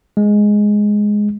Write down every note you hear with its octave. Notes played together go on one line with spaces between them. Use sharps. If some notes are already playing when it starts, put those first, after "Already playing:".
G#3